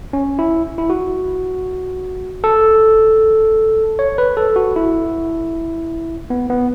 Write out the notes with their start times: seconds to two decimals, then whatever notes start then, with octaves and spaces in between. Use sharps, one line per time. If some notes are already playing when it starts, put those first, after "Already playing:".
0.13 C#4
0.39 E4
0.78 E4
0.90 F#4
2.44 A4
3.99 C#5
4.18 B4
4.37 A4
4.56 F#4
4.76 E4
6.30 B3
6.50 B3